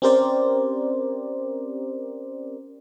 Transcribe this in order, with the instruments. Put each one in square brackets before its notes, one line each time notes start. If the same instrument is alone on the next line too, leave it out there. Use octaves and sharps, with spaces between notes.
[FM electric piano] C4 C#4 G4 A#4 C5 D5